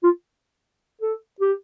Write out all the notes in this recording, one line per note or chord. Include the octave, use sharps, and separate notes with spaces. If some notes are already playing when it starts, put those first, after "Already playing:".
F4
A4
G4